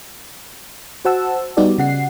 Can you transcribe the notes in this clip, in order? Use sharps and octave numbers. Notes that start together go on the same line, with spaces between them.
F#4 C5 F#5 A5 E6
G3 B3 D#4 F#4 G4 D5
C#3 F#5 C7